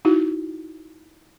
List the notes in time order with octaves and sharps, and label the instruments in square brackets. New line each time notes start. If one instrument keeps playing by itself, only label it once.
[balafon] D#4 E4 F#4